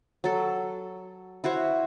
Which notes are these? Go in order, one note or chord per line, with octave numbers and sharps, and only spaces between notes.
F#3 A4
E4 F#4 C5 C#5